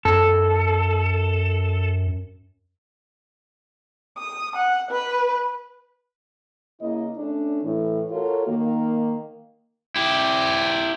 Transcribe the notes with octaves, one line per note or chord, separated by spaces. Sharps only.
F#2 A4
D#6
F#5
B4
C#3 A#3 E4 D#5
A3 C#4 D4
A2 E3
F4 F#4 A4 A#4 C#5
D#3 A#3
E4 G4